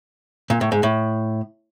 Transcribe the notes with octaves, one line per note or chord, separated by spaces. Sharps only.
A#2
A2
G#2
A2